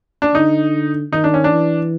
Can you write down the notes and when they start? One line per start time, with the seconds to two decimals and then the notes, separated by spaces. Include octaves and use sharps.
0.22 D4
0.34 D3 D#4
1.13 D#3 D#4
1.24 D4
1.34 C#4
1.44 D4
1.52 E3